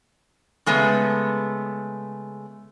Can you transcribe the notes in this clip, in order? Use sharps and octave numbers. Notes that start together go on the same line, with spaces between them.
C#3 G#3 A3 B3